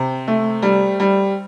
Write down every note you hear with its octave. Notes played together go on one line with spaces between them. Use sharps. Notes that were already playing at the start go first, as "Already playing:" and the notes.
Already playing: C3 C5
A3
G3
G3